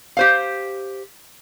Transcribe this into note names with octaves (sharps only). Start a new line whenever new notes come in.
G4 C5 F5